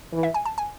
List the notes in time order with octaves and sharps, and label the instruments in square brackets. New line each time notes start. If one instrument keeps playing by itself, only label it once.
[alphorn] E3
[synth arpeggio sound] E5
G#5
A5
G#5